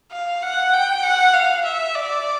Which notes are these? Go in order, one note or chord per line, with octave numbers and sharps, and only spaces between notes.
F5
F#5
G5
F#5
F5
E5
D5